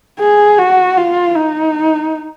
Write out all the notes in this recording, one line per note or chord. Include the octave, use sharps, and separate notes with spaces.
G#4
F#4
F4
D#4